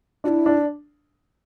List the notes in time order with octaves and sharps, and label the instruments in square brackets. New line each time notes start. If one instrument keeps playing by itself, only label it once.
[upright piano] D4 [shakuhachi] F#4
[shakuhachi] E4
[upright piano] D4